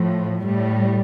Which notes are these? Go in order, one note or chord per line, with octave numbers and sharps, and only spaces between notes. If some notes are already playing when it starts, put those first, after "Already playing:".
Already playing: A2 F3
A2 G3